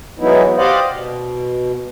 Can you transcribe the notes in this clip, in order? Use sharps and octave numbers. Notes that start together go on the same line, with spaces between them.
E3 F#3 G#3 B3 D#4 E4
G4 C5 D5 D#5 F5 F#5
B2